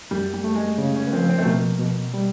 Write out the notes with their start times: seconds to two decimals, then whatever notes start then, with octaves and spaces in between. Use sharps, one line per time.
0.11 F#2 G3
0.34 G3
0.44 A3
0.56 G#3
0.78 C#3
0.96 C#4
1.07 B3
1.13 F3 C4
1.29 C4
1.38 A3
1.45 B2 A#3
1.80 B2
2.14 G3